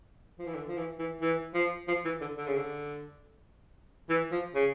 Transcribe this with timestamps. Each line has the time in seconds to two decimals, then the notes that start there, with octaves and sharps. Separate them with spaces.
0.39 F3
0.47 E3
0.55 D3
0.68 F3
0.77 E3
0.99 E3
1.21 E3
1.54 F3
1.88 F3
2.05 E3
2.21 D3
2.37 D3
2.47 C#3
2.56 D3
4.09 E3
4.32 F3
4.55 C#3